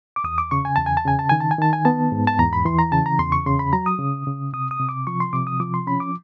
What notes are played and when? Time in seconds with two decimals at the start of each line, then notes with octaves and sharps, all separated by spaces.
0.16 D6
0.24 E2 D#6
0.38 D6
0.51 C#3 C#6
0.65 G#5
0.76 E2 A5
0.86 G#5
0.97 A5
1.05 C#3 G#5
1.19 A5
1.29 D#3 G#5
1.40 A5
1.51 G#5
1.58 D#3 A5
1.73 G#5
1.85 B3 A5
2.12 G#2
2.27 A5
2.39 E2 A#5
2.53 B5
2.65 E3 C6
2.79 A#5
2.92 C#3 A5
3.06 A#5
3.19 E2 C6
3.32 C#6
3.46 C#3 C6
3.59 B5
3.73 F#3 A#5
3.86 D#6
3.99 C#3
4.27 C#3
4.53 C3 D#6
4.71 D#6
4.80 C3
4.89 D6
5.07 F3 C#6
5.20 C6
5.33 C3 D6
5.47 D#6
5.60 F3 D6
5.74 C6
5.87 C#4 B5
6.00 D6